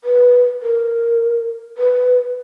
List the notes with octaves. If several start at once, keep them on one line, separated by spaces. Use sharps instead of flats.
B4
A#4
B4